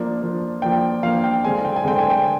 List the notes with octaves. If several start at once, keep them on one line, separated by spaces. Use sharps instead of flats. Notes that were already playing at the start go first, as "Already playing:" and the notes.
Already playing: F3 A#3 D4
F3 A#3 D4
F3 A#3 D4 G5
F3 A#3 D4 F5
G5
D3 G#3 C4 G#5
G5
G#5
D3 G#3 C4 G5
G#5
G5